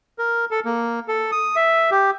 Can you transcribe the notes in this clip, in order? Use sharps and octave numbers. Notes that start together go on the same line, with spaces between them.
A#4
A4
A#3
A4
D#6
E5
G4